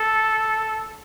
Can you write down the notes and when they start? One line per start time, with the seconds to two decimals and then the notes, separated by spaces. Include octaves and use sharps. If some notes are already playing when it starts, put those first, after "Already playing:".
Already playing: A4